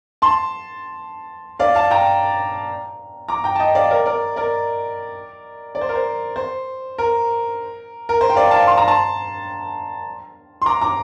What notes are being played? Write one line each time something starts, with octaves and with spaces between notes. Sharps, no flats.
A5 C6
D5 F5
F5 A5
G5 A#5
A#5 D6
G5 A#5
A5
D#5 G5
D5 F5
A#4 D5
A#4 D5
A#4 D5
D5
C5
A#4
C5
C5
A#4
A#4
C5
G5
D5 F5
F5 A5
C6
A#5
A5 C6
C6
A#5 D6
A#5 D6